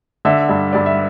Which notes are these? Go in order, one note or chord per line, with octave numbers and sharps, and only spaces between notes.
D3 E5
G2
G2 D5
E5